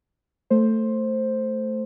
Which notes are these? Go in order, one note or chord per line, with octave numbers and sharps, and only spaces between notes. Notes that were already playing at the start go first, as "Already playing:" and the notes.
A3 C5